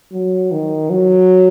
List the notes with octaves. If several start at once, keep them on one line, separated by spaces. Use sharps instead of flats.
F#3
D#3
F#3